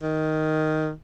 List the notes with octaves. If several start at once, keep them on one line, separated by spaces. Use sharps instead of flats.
D#3